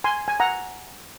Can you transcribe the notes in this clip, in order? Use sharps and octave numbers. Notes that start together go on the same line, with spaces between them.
G#5 C6
G#5
F#5 A#5